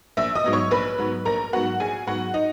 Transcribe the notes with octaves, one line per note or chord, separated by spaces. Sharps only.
A#1 E5 E6
D#5 D#6
G#2 F#3 B3
C#5 C#6
A#1 B4 B5
G#2 F#3 B3
A#1 A#4 A#5
G#2 F#3 B3 F#4 F#5
A#1 G#4 G#5
G#2 F#3 B3 F#4 F#5
D#4 D#5